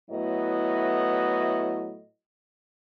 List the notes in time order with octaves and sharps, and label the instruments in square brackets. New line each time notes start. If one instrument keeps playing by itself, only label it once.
[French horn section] A2 F#3 B3 E4 D#5